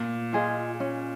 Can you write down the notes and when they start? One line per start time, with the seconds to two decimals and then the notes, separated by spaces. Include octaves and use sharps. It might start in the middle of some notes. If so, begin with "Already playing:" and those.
Already playing: A#2
0.33 F4 G#4 D#5
0.80 C#4